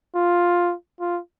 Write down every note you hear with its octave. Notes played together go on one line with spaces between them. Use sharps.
F4
F4